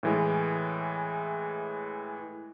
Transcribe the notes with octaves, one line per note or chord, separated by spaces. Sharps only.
A2 E3 G#3